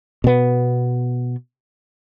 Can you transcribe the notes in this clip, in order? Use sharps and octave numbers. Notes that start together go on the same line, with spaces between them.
B2 B3